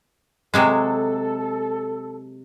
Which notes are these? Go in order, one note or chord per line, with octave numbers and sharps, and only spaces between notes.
C3 F#3 G#3 A4